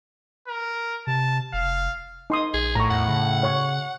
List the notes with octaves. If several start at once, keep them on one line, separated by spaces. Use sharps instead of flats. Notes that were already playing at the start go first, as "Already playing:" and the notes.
A#4
C3 A5
F1 F5
D#4 C6 D#6
A#1 G#4
A2 A#5 C#6
E2 F#5
C#3
C#5 C#6